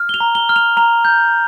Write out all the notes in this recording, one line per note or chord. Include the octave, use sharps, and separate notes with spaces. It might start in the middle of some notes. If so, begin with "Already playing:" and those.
Already playing: F6
G7
F7
A#5
G7
F6
F7
A#5 F7
G6